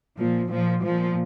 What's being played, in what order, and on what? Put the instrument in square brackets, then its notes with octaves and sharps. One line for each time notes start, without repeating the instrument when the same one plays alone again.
[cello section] A#2 F3
A#2 F3
A#2 F3